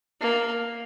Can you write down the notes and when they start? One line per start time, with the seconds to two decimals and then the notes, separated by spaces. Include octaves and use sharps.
0.21 A#3